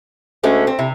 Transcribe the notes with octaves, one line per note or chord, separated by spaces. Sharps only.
D2 G#3 A3 C#4
C4
C3 E4